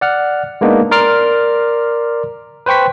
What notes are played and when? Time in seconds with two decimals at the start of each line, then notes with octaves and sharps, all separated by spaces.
0.01 D5 F#5 F6
0.61 G#3 A#3 B3 D4 D#4
0.91 A#4 D5 C6 D6 F6
2.66 B4 C5 G5 C#6 B6